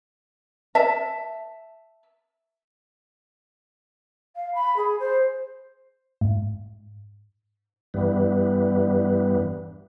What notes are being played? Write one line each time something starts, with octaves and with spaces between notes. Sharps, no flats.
E5 A5
F5
B5
G#4
C5
G#2
G2 E3 G3 B3